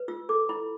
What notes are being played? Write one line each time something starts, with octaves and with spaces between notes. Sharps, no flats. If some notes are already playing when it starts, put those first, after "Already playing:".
Already playing: B4
F4 E6
A4 D6
E4 B5